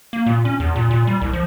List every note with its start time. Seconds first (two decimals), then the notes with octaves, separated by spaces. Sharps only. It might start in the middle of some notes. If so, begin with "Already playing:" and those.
0.13 A#3
0.26 A#2
0.45 C#4
0.60 E2
0.76 A#2
0.91 A#2
1.07 G3
1.21 C2
1.33 F3